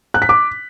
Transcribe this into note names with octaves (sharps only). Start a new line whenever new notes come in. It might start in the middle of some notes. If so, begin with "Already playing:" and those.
F#6
B6
D6